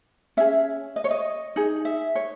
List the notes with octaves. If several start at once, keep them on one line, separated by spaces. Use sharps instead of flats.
C#4 G#4 E5
D#5
C#5
D#5
D#4 G#4
E5
C#5